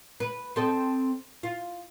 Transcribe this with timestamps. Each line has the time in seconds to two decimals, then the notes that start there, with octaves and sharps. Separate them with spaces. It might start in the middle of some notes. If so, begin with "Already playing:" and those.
0.20 B4
0.56 C4 A4 D#5
1.43 F4